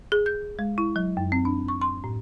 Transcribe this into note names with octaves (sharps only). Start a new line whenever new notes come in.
G#4
G6
G#3
E4
F#3
F#2
C4
D4
C#6
C6
A2